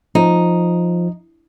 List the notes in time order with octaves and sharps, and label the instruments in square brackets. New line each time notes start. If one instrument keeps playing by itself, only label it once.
[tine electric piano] F3 [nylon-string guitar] D#4